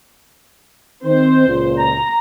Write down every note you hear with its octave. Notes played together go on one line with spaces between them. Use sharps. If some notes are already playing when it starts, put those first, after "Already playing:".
D#3 C4 C5
C#2 A#2
A#5